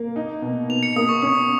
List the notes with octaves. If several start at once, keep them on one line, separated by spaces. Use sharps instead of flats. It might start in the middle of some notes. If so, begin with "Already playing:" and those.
Already playing: A#3
D#4
B2
B2 F7
C#7
A#3 D#6
C#6
C#4 D#6